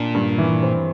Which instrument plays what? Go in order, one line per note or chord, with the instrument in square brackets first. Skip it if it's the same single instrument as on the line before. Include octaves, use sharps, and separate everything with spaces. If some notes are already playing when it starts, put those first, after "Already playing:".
Already playing: [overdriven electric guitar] A#2 [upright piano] D4
[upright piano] G2
E3
C4